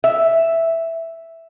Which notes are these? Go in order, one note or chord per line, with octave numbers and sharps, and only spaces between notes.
E5